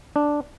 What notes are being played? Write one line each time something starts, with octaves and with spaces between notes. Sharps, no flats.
D4